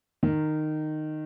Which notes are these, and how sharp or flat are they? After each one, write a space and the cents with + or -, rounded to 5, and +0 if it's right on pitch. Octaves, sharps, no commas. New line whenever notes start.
D#3 -15